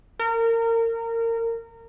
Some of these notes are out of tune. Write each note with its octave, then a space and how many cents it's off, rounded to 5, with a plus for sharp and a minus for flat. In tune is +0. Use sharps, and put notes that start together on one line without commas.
A#4 -25